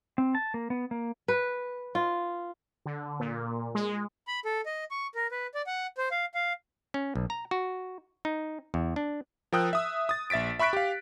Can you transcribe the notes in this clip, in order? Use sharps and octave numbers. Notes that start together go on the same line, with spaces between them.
C4
A5
A#3
B3
A#3
B4
F4
D3
A#2
G#3
B5
A4
D#5
C#6
A#4
B4
D5
F#5
C5
F5
F5
C#4
B1
A#5
F#4
D#4
E2
D4
F3 A#4 G5 D#6 E6 F#6
E5 D#6 E6
D#6 A6
A#1 E5 A6 B6 D7
E5 B5 C#6 F#6 B6 D7
G4 F5